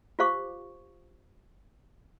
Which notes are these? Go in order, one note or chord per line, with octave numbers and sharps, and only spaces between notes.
F4 G4 C5 F5 C#6 D6